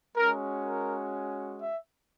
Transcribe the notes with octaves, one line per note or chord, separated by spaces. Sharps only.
G#3 C#4 F#4 A#4
A#4
E5